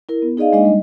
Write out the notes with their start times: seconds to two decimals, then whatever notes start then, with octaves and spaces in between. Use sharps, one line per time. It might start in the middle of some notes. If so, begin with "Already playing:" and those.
0.09 E4 A#4
0.22 B3
0.37 D#4 G#4 D5 D#5 F5
0.53 G#3 A#3 D4 D#4 D#5
0.65 G3